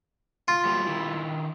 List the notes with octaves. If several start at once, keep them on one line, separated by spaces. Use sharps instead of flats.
F4
F#3 G3 A#3
D#3 E4